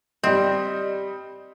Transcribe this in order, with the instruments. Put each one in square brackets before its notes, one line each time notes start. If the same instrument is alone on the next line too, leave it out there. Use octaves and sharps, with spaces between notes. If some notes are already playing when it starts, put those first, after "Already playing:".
[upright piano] G3 D#5 [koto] C4